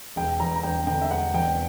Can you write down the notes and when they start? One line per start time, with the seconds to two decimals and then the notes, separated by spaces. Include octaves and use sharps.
0.16 E1 G5
0.40 E2 A#5
0.56 A#5
0.63 E1 G5
0.87 D3 G5
1.02 E5
1.11 E1 F#5
1.34 E2 G5